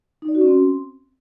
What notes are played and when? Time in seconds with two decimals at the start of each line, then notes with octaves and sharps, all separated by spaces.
0.22 D#4
0.28 D5
0.35 F#4
0.41 C#4
0.47 C4